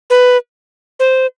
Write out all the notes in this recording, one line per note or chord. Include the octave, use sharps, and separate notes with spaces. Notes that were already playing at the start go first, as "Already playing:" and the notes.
B4
C5